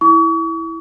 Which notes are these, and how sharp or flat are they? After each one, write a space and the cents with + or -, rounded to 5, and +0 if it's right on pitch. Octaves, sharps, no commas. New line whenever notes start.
E4 -5 C#6 +40